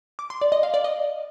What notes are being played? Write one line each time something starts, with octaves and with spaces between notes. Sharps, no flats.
D6
C6
D5
D#5
F5
D5
D#5